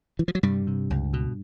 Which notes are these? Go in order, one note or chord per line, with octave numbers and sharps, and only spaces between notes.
E3
F3
F#3
G2 C3 G3
C3
C#2
B2